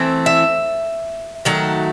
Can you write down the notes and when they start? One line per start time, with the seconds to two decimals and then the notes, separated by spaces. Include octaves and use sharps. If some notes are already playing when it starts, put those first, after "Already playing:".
Already playing: E3 A3 C4
0.26 E5
1.45 D#3 F#3 A3 F#5